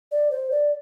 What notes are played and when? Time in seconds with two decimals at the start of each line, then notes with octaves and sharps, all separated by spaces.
0.12 D5
0.31 C5
0.51 D5